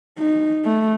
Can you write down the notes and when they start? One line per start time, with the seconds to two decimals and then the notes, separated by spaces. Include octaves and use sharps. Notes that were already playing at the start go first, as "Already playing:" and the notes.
0.18 D#4
0.64 A3